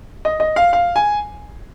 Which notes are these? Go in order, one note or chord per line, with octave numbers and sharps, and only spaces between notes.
D#5
D#5
F5
F5
G#5